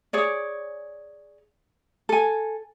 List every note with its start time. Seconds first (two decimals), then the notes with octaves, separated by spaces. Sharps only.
0.13 G#4 C#5 D5
2.09 A4 G#5